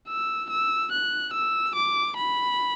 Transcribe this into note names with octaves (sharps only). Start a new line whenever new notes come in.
E6
E6
F#6
E6
D6
B5